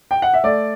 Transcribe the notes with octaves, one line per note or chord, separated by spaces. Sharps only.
G5
F#5
E5
A3 D5